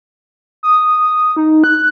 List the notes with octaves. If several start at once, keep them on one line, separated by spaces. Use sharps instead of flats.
D#6
D#4
F#6